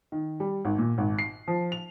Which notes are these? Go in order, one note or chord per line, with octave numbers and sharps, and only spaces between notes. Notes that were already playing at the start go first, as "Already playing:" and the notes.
D#3
G3
G#1
A#2
G#1
C7
F3
F7